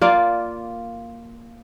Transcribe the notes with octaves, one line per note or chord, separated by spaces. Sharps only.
A#3 F4 D5